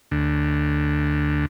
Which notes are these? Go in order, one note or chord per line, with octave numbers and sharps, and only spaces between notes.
D2